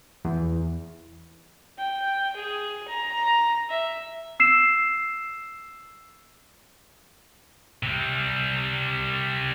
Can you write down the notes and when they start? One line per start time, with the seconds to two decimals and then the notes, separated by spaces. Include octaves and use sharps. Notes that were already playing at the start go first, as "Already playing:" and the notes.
0.24 E2
1.78 G5
2.36 G#4
2.88 A#5
3.69 E5
4.40 E6 C7 E7
7.83 C3 G3